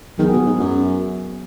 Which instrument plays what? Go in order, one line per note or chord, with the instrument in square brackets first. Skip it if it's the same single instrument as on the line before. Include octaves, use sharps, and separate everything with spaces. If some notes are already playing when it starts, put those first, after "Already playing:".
[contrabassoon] D#3 [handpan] F#3 B3 G#4
[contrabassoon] B2
G#2
F#2